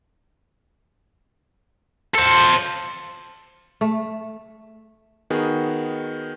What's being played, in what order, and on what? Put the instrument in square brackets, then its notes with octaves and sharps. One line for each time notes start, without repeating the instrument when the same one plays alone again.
[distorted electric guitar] A4 C5
[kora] A3
[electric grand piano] D#3 B3 F#4 G#4